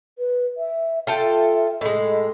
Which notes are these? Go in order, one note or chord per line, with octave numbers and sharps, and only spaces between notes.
B4
E5
F4 A4 E5 G5
A2 G#3 D#5